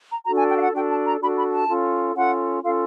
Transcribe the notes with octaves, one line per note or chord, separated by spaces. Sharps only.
A#5
D4 F#4 A4 A#5
G#5
G5
F5
F#5
D4 F#4 A4 G5
A5
A#5
D4 F#4 A4 B5
B5
A5
C#4 F4 A4
C#4 F4 A4 F#5
C#4 F4 A4 F5